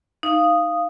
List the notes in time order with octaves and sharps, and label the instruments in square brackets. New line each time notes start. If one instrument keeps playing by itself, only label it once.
[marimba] D#4 [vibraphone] F5 D#6